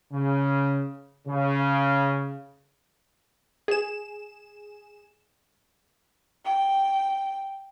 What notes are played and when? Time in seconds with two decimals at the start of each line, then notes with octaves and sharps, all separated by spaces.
0.11 C#3
1.27 C#3
3.68 G#4 E7
6.45 G5